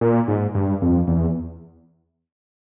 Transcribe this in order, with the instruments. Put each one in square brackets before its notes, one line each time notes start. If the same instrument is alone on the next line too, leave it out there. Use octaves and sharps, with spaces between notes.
[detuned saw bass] A#2
G#2
G2
F2
E2